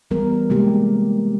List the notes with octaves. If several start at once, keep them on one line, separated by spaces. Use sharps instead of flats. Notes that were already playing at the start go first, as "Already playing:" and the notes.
E3 G3 B3 A#4
C3 G#3 A#3 G4